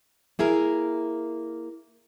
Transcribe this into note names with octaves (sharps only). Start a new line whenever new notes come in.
A#3 E4 G#4 A#4